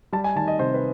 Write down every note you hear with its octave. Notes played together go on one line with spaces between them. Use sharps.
G3 A5
G#5
D#3 A5
D#5
C3 C5
B4